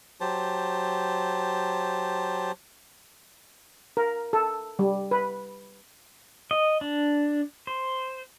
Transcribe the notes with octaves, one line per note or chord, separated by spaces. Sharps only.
F#3 G4 C5 A5
A#4
A4
G3
B4
D#5
D4
C5